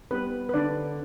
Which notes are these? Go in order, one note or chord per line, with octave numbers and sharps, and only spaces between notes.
G3 B3 B4
B4
D3 D5